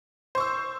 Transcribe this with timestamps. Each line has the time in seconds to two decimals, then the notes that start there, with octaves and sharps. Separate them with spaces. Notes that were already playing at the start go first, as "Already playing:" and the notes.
0.35 C5
0.38 C#6
0.40 E6